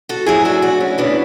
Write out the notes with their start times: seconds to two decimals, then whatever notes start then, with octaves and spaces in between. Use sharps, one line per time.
0.09 F#4 A4
0.26 G#2 F#3 E4 G#4
0.45 D4 F#4
0.62 D4 F#4
0.80 C#4 E4
0.98 F#2 C#3 E3 B3 D4